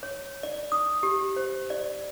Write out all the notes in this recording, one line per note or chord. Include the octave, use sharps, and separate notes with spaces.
C#5
D5
D#6
G4
C5
D5